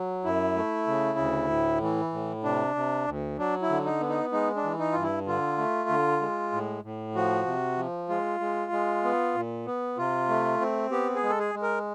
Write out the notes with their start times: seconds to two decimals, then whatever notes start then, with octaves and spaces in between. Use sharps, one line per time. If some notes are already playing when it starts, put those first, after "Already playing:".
Already playing: F#3
0.25 F#2 E4
0.56 A3
0.87 C#3
1.19 D2
1.50 A2
1.82 E3
2.13 A2
2.44 C3 D4
2.75 C3
3.07 D2
3.38 F#3 D4
3.62 E4
3.70 D3
3.85 D#4
4.01 B3
4.09 D#4
4.32 G#3 D#4
4.56 D4
4.64 E3
4.79 D#4
4.92 G2 F4
5.03 E4
5.27 D3 F4
5.58 A3
5.89 D3
6.21 G#3
6.52 A2
6.84 A2
7.15 F3 F#4
7.46 C3
7.77 F3
8.09 G#3 F4
8.40 G#3
8.72 G#3
9.04 B3
9.35 A#2
9.66 B3
9.97 C3 F4
10.29 A3
10.61 C4
10.91 B3 G4
11.15 G#4
11.23 G#3
11.30 A4
11.39 G#4
11.55 G#3
11.62 A#4